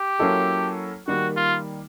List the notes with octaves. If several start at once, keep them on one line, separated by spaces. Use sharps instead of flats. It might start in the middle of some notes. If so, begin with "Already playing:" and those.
Already playing: G4
F#3 A#3 C#4 E4 A4
D#3 G3 A#3 F#4
F4